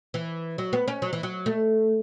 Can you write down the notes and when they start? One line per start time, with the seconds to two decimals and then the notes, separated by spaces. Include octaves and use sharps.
0.14 E3
0.58 F#3
0.73 B3
0.88 C#4
1.02 F#3
1.13 E3
1.23 F#3
1.46 A3